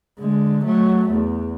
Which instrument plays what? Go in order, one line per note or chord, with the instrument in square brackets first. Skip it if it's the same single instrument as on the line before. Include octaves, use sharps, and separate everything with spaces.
[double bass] D3 G#3
F#3 A3
E2